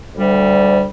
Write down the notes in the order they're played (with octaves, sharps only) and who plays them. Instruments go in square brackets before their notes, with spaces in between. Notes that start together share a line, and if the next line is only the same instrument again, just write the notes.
[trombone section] D2 [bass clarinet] G3